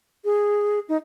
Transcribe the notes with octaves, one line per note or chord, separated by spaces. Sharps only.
G#4
D#4